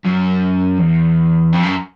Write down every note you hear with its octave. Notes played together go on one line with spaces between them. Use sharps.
F#2
E2
F2
F#2